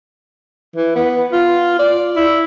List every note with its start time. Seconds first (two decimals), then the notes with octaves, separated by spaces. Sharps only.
0.76 E3
0.95 B3
1.32 F4
1.79 D5
2.16 E4